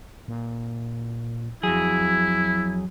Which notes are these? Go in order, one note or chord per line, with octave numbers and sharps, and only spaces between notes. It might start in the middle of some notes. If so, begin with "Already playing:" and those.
A#2
F2 F#3 E4 G#4